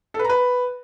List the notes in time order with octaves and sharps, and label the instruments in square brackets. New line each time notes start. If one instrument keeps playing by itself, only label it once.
[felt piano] A4
B4
A#5
B4